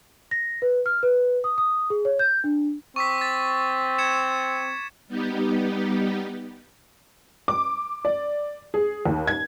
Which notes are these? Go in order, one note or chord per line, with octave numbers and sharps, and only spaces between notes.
A#6
B4
F6
B4
D#6
D#6
G#4
C#5
G6
D4
C4 C#6 D6 B6
A6 B6
G#6 C#7 E7
G3 B3 D#4 G4
D6
D5
G#4
D#2
G#6